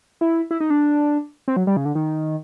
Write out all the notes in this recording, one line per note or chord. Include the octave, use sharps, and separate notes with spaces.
E4
E4
D#4
D4
C4
F#3
G3
C#3
D3
D#3